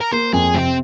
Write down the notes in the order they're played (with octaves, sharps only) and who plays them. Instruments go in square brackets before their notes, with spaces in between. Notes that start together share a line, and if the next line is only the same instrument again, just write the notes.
[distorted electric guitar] A#4
[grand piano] A#3 [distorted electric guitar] C5
[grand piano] F2 [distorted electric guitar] G#4
[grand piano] C3 [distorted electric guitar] C4